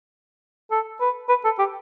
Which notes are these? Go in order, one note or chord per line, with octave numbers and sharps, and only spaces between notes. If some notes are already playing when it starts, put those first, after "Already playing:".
A4
B4
B4
A4
G4